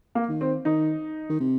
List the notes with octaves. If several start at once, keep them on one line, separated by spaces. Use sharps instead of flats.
A#3
D#3
C4
D#3 D#4
D#3
C3